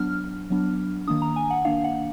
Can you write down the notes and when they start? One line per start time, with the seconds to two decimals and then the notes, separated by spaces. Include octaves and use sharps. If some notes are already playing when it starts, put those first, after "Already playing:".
Already playing: F#3 B3 D4 F6
0.50 F#3 B3 D4
1.07 D#3 A#3 D4 D#6
1.22 A#5
1.36 G#5
1.50 F#5
1.65 D#3 A#3 D4 F5
1.84 F#5